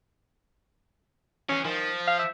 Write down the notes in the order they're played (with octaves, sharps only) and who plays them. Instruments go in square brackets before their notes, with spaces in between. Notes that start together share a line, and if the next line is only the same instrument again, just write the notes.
[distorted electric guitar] E3 G#4 [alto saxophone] C#4
[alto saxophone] D#3 [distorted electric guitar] F3
[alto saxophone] F5
E5